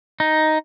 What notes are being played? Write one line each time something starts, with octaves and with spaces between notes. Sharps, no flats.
D#4